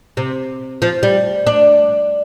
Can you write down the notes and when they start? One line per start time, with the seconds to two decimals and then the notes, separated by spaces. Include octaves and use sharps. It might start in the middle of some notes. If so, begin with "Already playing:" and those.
0.17 C3
0.82 F3
1.03 G3
1.47 D4